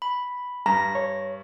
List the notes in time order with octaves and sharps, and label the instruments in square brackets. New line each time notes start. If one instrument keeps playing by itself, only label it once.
[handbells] B5
[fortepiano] G2 [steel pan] A#5 [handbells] A#6
[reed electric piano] C#5